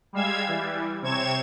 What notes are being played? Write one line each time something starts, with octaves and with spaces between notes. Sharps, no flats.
G3 G#3 F5 E6 G#6
E3 G3
C3 C4 C#5 G#6 E7